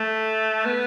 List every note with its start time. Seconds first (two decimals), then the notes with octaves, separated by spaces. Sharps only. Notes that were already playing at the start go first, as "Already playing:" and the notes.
Already playing: A3
0.65 B3